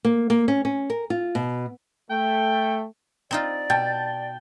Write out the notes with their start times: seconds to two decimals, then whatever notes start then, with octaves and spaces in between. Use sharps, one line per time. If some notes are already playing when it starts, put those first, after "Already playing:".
0.05 A#3
0.30 A#3
0.48 C#4
0.65 C#4
0.90 A#4
1.10 F4
1.35 B2
2.10 A3 G5
3.31 C4 D#4 F4 D5
3.70 B2 G5 A5